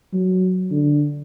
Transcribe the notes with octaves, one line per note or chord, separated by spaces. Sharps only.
F#3
D3